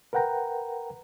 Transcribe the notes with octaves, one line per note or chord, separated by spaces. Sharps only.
A#4 B4 F#5 G5 A#5